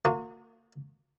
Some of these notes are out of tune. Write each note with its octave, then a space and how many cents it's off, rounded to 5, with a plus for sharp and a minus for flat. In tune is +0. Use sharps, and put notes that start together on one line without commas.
A#3 -30 F#4 -40